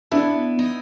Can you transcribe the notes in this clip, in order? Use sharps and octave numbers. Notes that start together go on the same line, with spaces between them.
B3 D4 E4
D#4